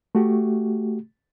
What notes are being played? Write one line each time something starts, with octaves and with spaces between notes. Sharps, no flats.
A3 F#4 G4